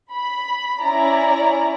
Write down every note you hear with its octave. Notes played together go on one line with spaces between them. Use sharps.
B5
C#4 E4 D5 A#5